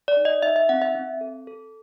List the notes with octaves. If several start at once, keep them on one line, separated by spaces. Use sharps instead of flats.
D5
D#4
D#5
D#4 E5
E5
C4 F#5
E5
C4
A4
A4